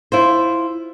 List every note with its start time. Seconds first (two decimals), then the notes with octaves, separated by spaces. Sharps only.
0.12 E4 F4 C5